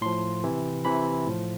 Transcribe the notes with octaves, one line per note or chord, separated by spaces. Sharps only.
A2 F3 C6
C3 E3
C3 E3 B5
A2 F3